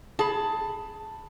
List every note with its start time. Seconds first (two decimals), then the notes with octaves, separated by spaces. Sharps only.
0.19 G#4 A5 B5